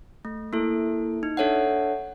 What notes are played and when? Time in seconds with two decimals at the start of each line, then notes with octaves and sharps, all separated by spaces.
0.25 A3
0.53 A#3 E4 A4
1.23 D#4
1.37 D4 A4 C#5 E5 F#5